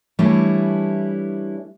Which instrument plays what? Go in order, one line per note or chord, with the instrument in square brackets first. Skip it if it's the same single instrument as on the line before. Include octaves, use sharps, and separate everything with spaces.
[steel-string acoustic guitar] E3 G3 A3 D4 E4 C#5